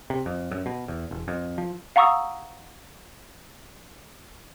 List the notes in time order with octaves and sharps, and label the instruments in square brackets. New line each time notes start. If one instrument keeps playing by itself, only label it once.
[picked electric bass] C3
F2
F#2
B2
E2
E1
F2
F3
[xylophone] F5 F#5 A#5 C#6 D#6 E6